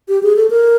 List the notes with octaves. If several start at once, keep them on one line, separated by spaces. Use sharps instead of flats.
G4
G#4
A4
A#4